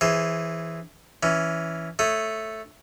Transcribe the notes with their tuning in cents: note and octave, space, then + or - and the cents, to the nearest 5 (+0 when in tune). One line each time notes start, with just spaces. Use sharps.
E3 +0 G#4 +0 C5 +25
E3 +0 C#4 +10
A3 +0 C#5 +0 D#6 +0